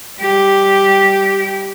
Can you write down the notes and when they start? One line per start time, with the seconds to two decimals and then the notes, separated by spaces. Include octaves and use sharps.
0.19 G3 G4